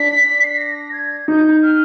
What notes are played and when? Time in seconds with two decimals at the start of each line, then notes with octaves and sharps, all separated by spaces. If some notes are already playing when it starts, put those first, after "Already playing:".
Already playing: D4 B6
0.42 C7
0.50 B6
0.57 A#6
0.92 G#6
1.28 D#4 G6
1.63 F6